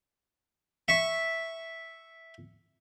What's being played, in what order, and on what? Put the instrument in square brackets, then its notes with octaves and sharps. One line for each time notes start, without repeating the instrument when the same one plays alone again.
[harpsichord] E5 C#6